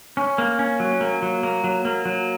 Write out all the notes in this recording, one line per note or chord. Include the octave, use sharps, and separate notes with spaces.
C#4
A#3
C#4
F#3
A#3
F#3
A#3
F#3
A#3
F#3